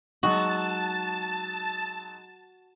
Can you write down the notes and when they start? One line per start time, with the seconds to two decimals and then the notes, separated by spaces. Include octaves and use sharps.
0.23 F#3 G#3 D#4 F#4 A5